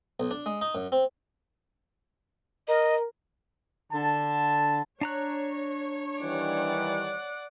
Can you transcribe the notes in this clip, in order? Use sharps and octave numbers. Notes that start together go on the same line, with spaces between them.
B1
D4
G#3
D#4
F#2
C4
A#4 D#5
D3 A5
D4 C#5 A#5 F#6
D#3 E3 G3 D5 F#5